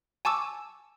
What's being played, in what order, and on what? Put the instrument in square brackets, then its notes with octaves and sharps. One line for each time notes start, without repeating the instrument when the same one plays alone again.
[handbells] G#5 A5 C#6 D6 E6